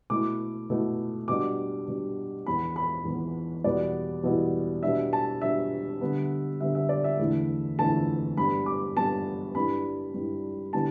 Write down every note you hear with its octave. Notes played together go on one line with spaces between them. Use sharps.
B2 A3 E4 D6
B2 A3 E4
B2 G3 D4 D6
B2 G3 D4
E2 E3 B3 B5
B5
E2 E3 B3
E2 B2 G3 B3 E4 D5
E2 B2 G3 B3 E4
B2 G3 D4 E5
A5
B2 G3 D4 E5
D3 G3 B3
D3 G3 B3 E5
E5
D5
E5
E2 D3 A3 E4
E2 D3 A3 E4 A5
G2 G3 B3 B5
D6
G2 G3 B3 A5
G2 G3 E4 B5
G2 G3 E4
D3 G3 B3 E4 A5